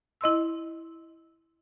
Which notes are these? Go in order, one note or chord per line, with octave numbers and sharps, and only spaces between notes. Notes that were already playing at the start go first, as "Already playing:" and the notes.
E4 D#5 C6 E6